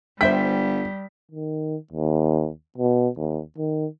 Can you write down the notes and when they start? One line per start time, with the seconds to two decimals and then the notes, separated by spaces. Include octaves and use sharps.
0.21 G1 G3 C5 E5 G5 B6
1.31 D#3
1.92 D#2
2.78 B2
3.16 D#2
3.58 D#3